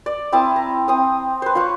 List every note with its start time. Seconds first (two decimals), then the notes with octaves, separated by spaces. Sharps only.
0.06 D5
0.32 C4 E4 A5 D#6
0.56 A#5
0.88 C4 D#6
1.42 B4 C5
1.55 F4 C#5 B5 C#6